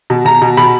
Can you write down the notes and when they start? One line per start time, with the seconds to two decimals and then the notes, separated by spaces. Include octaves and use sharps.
0.10 B2
0.25 B2 A#5
0.42 B2
0.57 B2 B5